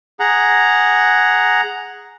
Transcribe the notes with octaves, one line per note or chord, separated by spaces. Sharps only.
G#4 F#5 A#5